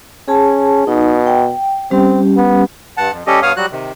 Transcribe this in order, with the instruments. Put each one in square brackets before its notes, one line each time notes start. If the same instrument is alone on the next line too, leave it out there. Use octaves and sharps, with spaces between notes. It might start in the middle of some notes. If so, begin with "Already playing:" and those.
[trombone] C#4 [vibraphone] G#4 A5
[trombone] B2 [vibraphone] D#4
[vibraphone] G5
[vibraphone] G3 C#4 G4 [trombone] C4
[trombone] B3
[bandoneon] G2 F#5 A5
F2
G3 C#4 G4 A4 D#5
G2 B3 C#5 F5 D#6 F6
F#3 G3 F#4 F#6
C3 D#3